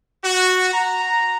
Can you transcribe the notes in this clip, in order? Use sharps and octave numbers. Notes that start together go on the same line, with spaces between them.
F#4
A#5